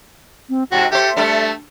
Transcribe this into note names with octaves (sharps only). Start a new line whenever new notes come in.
C4
G#2 C3 F#4 G5
G4 A4 C5 E5
G3 A3 D4 A4